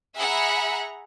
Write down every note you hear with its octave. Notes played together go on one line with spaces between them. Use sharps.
G#4 E5 F#5 A#5 B5